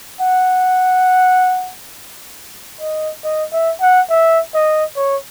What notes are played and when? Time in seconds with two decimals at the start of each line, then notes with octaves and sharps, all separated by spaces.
0.21 F#5
2.81 D#5
3.24 D#5
3.53 E5
3.81 F#5
4.10 E5
4.54 D#5
4.96 C#5